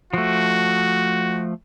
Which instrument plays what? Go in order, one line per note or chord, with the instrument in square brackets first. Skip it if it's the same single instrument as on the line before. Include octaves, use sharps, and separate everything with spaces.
[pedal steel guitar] F3 A3 [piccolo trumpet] F#4